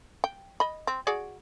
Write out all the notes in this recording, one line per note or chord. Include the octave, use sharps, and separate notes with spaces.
G5
D#5 B5
C4
F#4 G#4 D5